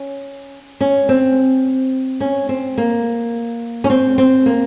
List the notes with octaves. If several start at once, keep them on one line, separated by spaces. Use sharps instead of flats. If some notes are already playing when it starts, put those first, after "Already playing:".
Already playing: C#4
C#4
C4
C#4
C4
A#3
C#4
C4
C4
A#3